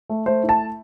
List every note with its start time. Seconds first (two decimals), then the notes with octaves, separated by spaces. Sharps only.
0.10 A3
0.26 A3 C5
0.43 E4
0.49 A5